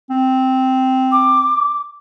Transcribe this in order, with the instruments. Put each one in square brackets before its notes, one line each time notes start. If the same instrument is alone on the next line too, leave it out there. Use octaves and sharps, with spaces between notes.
[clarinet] C4
[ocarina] D6